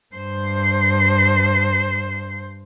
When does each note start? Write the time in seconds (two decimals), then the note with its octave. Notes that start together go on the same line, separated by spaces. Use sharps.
0.15 G2 C5